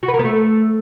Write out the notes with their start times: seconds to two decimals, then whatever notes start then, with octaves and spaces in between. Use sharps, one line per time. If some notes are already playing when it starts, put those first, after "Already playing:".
0.03 F#4
0.08 B4
0.14 A#4
0.19 B3
0.25 A3